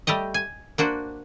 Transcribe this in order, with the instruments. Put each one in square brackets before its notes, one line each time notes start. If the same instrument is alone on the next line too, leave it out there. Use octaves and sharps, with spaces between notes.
[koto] G3 A3 G4 D#5
G#5
A#3 D4 F#4 C5